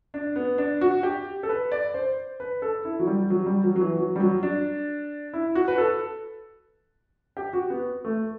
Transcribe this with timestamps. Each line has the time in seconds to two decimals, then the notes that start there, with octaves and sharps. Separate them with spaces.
0.14 D4
0.36 B3
0.58 D4
0.81 F#4
1.03 G4
1.43 A4
1.49 B4
1.72 D5
1.94 C5
2.40 B4
2.62 A4
2.85 E4
2.99 F#3
3.07 G3
3.30 F#3
3.46 G3
3.64 F#3
3.76 F#3
3.81 E3
3.98 F#3
4.16 G3
4.20 F#3
4.43 D4
5.33 E4
5.55 F#4
5.68 B4
5.78 A4
7.37 G4
7.53 F#4
7.70 B3
8.05 A3